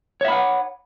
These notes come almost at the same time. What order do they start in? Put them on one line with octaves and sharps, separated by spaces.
C#5 E5 B5 F#5